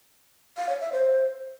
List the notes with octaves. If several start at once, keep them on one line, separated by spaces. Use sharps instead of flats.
F5
C#5
E5
C5